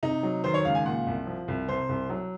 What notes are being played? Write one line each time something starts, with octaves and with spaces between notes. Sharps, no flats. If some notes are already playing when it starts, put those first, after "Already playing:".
C3 D#4
F#3
D#3 C5
C#5
C#2 F5
G#5
A#2 F#5
C2
F3
C2
C3 C5
C2
F#3